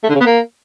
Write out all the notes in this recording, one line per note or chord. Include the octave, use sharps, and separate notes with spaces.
A3
D3
C#3
B3
A#3